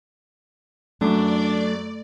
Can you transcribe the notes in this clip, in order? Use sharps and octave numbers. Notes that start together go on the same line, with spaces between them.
F#2 A3 D4 D5